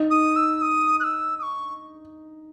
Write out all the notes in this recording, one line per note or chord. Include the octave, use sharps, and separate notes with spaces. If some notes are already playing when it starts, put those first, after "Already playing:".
Already playing: D#4
D#6
E6
D#6
F#6
E6
D#6
C#6